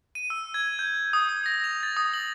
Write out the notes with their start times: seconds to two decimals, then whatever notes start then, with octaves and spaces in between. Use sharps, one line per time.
0.15 D#7
0.30 E6
0.54 G#6
0.79 G6
1.13 D#6
1.29 D#6
1.46 A#6
1.64 F7
1.83 A6
1.97 D#6
2.14 F#7